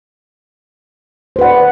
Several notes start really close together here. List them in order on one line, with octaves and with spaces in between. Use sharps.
C5 B4 F#5 D5